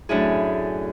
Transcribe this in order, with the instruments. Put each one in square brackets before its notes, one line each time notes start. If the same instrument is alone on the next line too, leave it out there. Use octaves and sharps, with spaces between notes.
[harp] F#2 A2 D4 E4 G#4